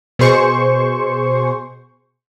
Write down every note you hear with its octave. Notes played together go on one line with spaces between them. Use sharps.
B2 G#4 C5 C#6